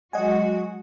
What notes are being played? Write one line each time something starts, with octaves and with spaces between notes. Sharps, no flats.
F#3 G#3 F#4 D#5 F#5 G#5